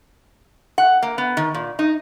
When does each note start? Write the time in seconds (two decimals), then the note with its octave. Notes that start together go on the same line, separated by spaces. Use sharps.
0.78 F#5
1.02 A#3
1.18 B3
1.37 D#3
1.54 A#2
1.79 D#4